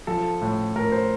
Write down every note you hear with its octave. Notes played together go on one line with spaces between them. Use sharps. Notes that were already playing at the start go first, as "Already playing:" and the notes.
F3 A4
A2
A2 A#4
C5